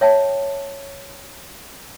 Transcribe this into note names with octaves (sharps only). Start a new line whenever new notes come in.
C#5 E5 G5 A5